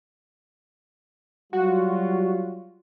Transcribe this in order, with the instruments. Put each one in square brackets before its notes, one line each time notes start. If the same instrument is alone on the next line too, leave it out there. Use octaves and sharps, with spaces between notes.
[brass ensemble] F#3 G3 F4 [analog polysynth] F#4